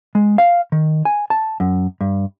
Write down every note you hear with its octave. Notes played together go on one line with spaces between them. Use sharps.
G#3
F5
D#3
G#5
A5
F#2
G2